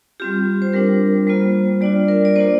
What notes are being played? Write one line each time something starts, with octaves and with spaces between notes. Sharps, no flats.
G3 C4 F4 G4
C5
G3 D4 F4 A#4
G3 A#3 F4 C5
G3 D4 F4 D5
A#4
D5
A#3 D4 F4 C5